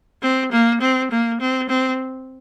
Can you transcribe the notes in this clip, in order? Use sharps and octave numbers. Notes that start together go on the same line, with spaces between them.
C4
A#3
C4
A#3
C4
C4